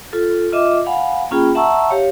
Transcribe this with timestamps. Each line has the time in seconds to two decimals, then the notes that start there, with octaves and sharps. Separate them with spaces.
0.13 F4 A4
0.53 F4 D#5 E5 D6
0.86 F5 F#5 G#5 B5
1.31 A#3 C#4 F4 G#4 G5 B5
1.55 E5 F#5 A5 A#5 C#6 E6
1.89 G4 C#5 F5